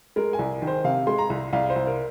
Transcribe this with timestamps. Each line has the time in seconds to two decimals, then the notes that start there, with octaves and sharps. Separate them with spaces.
0.16 G#3 A#4
0.33 G#5
0.39 C2
0.62 D#3
0.67 C5
0.84 C3 F5
1.07 G#3 C6
1.18 A#5
1.30 C2
1.53 C2 F5
1.70 C5
1.76 C2
1.87 A#4